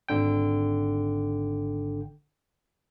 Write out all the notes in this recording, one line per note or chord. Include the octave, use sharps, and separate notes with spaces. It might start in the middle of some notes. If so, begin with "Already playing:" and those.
G#1 D3 G5